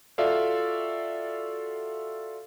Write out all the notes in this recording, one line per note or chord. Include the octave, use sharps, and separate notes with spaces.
F4 F#4 A4 D5 E5 F5